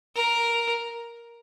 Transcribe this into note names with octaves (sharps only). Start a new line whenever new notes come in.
A#4